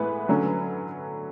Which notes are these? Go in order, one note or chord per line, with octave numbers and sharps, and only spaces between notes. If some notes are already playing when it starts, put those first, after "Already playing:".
Already playing: A2 E3 G#3 B3 B4
D3 F#3 C#4